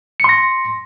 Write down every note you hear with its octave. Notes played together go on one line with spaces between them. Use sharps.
C6 A#6 C#7